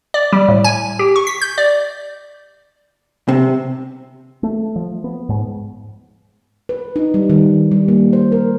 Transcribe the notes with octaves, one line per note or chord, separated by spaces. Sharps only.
D5
G3
A2
G#5
G4
C#6
B6
G6
D5
C3
A3
F3
B3
G#2
B4
D#4
G3
D#3
G3
A#3
C5
A#4